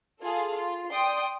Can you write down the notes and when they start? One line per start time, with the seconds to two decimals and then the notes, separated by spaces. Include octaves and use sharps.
0.22 F4 G#4 A4 F5
0.56 F4
0.91 D5 G5 C6 D#6